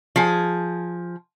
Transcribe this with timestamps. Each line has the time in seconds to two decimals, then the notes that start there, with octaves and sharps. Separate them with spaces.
0.16 F3 G#4